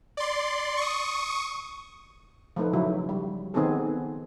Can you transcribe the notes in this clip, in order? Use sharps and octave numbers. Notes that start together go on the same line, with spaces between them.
D5 C6
C#6 D#6
F3 A3 D#4 B4
C#3 F#3 E4 F#4
G3
D#3 B3 C4 D#4 G#4 A4